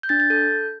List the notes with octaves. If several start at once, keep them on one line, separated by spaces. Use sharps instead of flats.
G6
D4 A6
A6
A4 G6